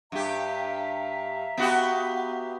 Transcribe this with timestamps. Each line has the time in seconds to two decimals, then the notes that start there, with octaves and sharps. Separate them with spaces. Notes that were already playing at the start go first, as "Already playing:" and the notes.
0.12 G2 G4 E5 F5 A#5
1.58 B3 F#4 G4